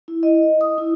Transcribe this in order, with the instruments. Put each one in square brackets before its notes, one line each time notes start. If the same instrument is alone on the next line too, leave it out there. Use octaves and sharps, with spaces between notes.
[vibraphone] E4
D#5
D#6
E4